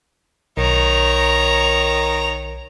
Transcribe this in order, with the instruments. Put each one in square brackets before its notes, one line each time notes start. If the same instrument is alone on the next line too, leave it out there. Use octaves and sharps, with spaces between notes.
[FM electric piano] B1 [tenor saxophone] D#3 [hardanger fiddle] C#5 A#5